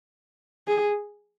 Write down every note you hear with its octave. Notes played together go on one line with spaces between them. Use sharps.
G#4